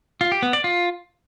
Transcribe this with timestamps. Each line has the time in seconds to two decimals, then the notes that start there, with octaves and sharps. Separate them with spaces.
0.21 F4
0.32 G4
0.42 B3
0.53 D5
0.64 F4